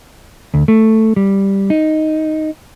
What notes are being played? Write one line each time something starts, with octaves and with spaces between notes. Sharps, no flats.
D2
A3
G3
D#4